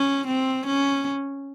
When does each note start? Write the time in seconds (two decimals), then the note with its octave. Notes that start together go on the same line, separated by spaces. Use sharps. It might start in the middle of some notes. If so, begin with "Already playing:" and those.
Already playing: C#4
0.27 C4
0.66 C#4